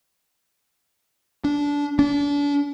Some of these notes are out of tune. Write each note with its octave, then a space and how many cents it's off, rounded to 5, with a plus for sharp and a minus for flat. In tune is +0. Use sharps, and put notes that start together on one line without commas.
D4 -20
D4 -35